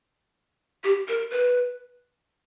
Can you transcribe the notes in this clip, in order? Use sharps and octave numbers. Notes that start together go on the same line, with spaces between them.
G4
A#4
B4